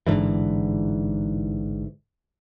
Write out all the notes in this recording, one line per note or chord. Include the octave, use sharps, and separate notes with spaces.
A1 G#2 D3 E3